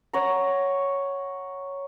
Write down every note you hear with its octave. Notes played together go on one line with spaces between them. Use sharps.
C#5 F#5 A#5